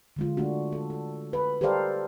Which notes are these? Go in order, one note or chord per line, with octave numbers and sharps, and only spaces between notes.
D3 G#3 F4
A3 D4 F#4
A4
A4
B4
G4 A4 A#4 C5 D5 F5